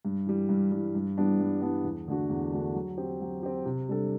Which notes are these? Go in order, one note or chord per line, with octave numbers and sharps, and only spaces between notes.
G2
E3 G3
G2
E3 G3
G2
E3 G3 B3 D4
G2
E3 G3 B3 D4
E2
D3 A3 D4 F#4
E2
D3 A3 D4 F#4
F#3
C4 G4
F#3
C4 G4
C3
G3 D4 A4